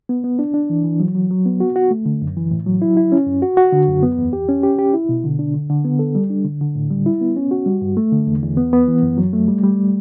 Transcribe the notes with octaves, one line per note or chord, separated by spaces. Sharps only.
B3
B3
D4
D4
E3
E3
F#3
F#3
F#3
B3
F#4
F#4
A3
D3
F#2
E3
A2
F#3
E4
E4
C#4
F#2
F#4
F#4
D3
F#2
B3
E2
G4
C#4
G4
G4
E4
B2
D3
D4
D3
D3
B3
A4
G3
D4
D3
D3
A2
G3
E4
B3
C#4
F#4
G3
G2
A3
D3
E2
E2
B3
B3
E3
F#2
F#3
A3
G3
G3